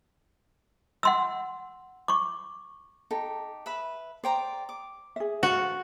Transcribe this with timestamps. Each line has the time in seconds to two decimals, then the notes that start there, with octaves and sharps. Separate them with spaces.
1.03 F#5 C6 E6
2.08 C#6 D6
3.11 D#4 G4 A4
3.66 B4 E5 B5
4.24 C5 D5 G5 A#5
4.69 D6
5.16 G#4 E5
5.43 F#4 A4 C5 F5